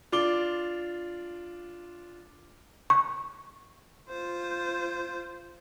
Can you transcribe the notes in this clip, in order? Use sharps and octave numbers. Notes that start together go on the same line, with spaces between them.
D4 F4 D6 G7
C#6
F4 C5